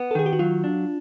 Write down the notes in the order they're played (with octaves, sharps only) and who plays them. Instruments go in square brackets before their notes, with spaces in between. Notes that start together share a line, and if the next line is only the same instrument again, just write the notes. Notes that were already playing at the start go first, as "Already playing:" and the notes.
Already playing: [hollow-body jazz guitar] B3
[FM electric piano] A4
[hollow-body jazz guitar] D#3 [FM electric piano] G#4
[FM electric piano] G4
F#4
[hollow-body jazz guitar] F#3 [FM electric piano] F4
[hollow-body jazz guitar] D4